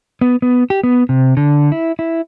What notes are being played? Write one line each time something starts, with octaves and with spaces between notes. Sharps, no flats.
B3
B3
G4
B3
C3
D3
E4
E4